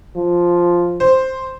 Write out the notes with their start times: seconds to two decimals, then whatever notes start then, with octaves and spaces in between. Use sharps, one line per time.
0.16 F3
1.00 C5